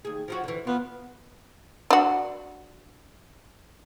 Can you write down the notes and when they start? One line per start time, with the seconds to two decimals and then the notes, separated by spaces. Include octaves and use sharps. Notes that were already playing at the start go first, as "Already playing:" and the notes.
0.05 D#2 G#4
0.28 F3 F#3 F#4
0.44 D3 E3
0.67 B3 F4
1.90 D4 F#4